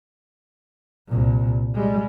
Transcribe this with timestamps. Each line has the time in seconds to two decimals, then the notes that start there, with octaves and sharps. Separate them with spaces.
1.08 C2 A#2
1.75 G3 G#3